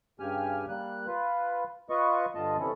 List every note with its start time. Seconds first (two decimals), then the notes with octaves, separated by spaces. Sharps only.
0.20 G2 C#3 G4 G#5 F6
0.69 G3 A#3 F#6
1.07 F4 B4
1.90 F4 B4 D#5 C#6
2.35 G2 D3 F4 D#5 A5
2.59 C3 E3 C#4 E4 A4